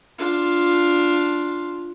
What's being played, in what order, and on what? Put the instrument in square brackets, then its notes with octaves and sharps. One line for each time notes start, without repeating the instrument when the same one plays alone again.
[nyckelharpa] D4 F4